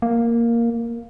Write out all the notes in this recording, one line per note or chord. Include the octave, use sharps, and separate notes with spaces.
A#3